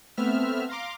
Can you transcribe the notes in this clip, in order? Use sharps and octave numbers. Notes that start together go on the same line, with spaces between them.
A3 B3 C4 E5 F6
F5 A#5 C6 D6